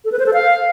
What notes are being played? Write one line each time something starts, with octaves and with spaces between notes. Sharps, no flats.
A4
B4
C5
A4
F5